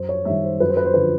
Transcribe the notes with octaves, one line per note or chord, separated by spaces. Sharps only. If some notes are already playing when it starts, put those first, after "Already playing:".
Already playing: F#2 C5
C#5
D#3 G3 E5
C5
F#2 B4
C5
B4
C5
D3 F3 B4